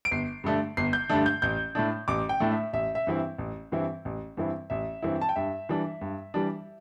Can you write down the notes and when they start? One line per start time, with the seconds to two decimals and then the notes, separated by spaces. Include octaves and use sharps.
0.05 D7
0.11 G1 C7
0.44 G2 D3 A3 D4
0.77 G1 C7
0.93 G6
1.09 G2 D3 A3 D4
1.26 G6
1.42 A1 G6
1.75 A2 A3 D4
2.08 A1 D6
2.29 G5
2.40 A2 A3 D4
2.51 E5
2.73 A1 E5
2.95 E5
3.07 G2 E3 C4 E4
3.39 A1
3.72 G2 E3 C4 E4
4.05 A1
4.37 G2 E3 C4 E4
4.70 A1 E5
5.02 G2 E3 C4 E4
5.21 A5
5.29 G5
5.36 G2 E5
5.69 E3 G3 D4
6.01 G2
6.34 E3 G3 D4